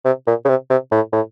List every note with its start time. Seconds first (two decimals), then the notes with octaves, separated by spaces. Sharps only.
0.05 C3
0.27 A#2
0.45 C#3
0.49 C3
0.70 C3
0.92 A2
1.13 A2